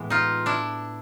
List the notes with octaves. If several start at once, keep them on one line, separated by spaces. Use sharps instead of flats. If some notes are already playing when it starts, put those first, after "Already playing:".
Already playing: A2 E3 G#3 B3
D#4 F4
D4 E4